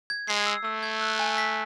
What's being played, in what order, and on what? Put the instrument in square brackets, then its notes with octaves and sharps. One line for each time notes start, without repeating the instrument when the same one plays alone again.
[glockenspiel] G#6
[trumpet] G#3 [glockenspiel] C7
[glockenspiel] E6
[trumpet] A3 [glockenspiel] E6
[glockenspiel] G#6
F#6
G#5
B6